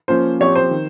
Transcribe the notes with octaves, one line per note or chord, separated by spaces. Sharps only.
F3 A#3 C#4 F4 C5
F3 C4 G4 C#5
C5
D#3